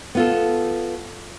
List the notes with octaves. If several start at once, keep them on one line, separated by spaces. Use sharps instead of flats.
B3 F4 A4